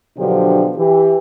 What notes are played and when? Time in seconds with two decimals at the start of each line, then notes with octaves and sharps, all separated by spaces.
0.17 B2 D3 F3 F#3 D4 G4
0.76 E3 G4